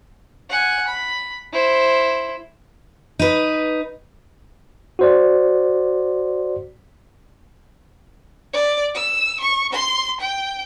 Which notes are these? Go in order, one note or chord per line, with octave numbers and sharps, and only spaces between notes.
F#5 G#5
B5
E4 C5
D#4 B4
F#4 C5 D5
D5
E6
C#6
C6
G5